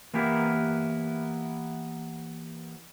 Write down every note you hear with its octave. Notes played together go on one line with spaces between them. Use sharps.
E3 A#3 B3 E4 G4 A#4